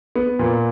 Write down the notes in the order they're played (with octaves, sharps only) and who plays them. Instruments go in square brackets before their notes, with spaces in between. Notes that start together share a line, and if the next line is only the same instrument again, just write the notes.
[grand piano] B3
A#2